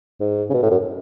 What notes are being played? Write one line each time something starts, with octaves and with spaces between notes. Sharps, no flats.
G#2
C#3
B2
A2
F#2